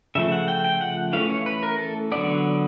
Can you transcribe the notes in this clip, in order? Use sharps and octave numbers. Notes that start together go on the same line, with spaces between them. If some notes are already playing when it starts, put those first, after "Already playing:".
C#3 F3 A3 E5
F#5
G5
G5
F#5
E3 A3 C#4 F5
C#5
B4
A#4
A4
D3 F#3 B3 D5